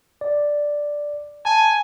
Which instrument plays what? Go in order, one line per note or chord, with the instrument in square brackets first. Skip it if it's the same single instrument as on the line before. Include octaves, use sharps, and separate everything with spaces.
[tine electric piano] D5
[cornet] G#5 [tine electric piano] A5